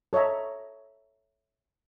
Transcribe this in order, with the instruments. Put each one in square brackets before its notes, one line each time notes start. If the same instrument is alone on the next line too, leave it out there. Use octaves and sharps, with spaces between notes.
[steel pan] A4 C#5 D#5 E5 A#5